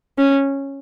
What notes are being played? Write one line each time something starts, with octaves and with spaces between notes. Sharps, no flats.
C#4